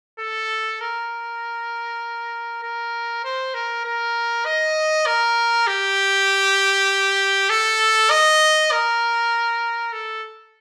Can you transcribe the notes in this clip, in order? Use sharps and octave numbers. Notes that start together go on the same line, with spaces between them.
A4
A#4
A#4
C5
A#4
A#4
D#5
A#4
G4
A4
D#5
A#4
A4